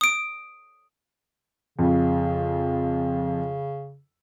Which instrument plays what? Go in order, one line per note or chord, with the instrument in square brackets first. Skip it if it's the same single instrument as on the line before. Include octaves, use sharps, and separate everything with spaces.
[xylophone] D#6 D7
[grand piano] F2 [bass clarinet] C#3